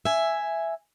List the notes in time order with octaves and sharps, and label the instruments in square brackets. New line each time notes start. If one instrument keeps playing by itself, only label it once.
[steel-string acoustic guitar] E5 G#5